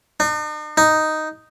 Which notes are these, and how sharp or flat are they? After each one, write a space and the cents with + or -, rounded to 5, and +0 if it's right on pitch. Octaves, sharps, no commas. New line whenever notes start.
D#4 -45
D#4 +0